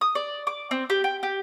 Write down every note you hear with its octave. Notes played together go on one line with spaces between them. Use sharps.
D#6
D5
D6
C4
G4
G5
G4